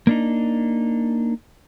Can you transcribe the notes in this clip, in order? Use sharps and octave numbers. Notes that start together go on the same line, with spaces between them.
A#3 D4 D#4